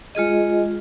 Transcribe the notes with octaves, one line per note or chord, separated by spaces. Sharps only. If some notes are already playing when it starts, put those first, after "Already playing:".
G#3 F4 G#4 D#5